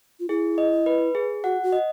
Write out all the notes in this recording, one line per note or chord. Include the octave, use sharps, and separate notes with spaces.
F4
E4 G#4
D#5
B4
G#4
F#4 F#5
F#4
D#5